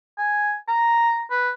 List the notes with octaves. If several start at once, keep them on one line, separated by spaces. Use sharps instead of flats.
G#5
A#5
B4